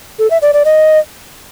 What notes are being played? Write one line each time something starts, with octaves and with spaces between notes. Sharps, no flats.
A4
E5
D5
D5
D#5